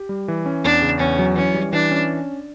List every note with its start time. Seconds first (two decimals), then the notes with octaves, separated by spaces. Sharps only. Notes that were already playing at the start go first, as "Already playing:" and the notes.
Already playing: G4
0.09 G3
0.28 E3
0.46 C#4
0.64 E2 D4
0.82 C#3
1.00 E2 C#4
1.19 F#3
1.36 E3 C#4
1.54 G3
1.73 E3 D4
1.91 C#4